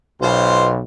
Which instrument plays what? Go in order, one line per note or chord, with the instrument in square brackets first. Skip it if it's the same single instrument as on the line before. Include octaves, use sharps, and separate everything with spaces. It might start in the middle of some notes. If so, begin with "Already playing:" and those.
[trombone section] B1 B2 [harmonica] F4 C5